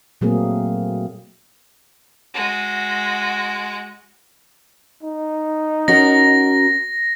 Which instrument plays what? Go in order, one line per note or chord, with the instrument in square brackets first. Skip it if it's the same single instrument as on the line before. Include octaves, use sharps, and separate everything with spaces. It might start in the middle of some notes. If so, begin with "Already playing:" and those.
[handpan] A#2 F#3 A3 A#3 C4 G#4
[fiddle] G#3 F#4
[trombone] D#4
[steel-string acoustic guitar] C#4 F#4 A#4 [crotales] A#6